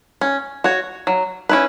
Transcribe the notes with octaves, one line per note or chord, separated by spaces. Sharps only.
C#4
F#4 C#5
F#3
C#4 E4 B4